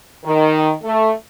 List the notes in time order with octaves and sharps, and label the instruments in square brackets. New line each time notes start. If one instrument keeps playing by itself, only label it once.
[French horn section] D#3
A3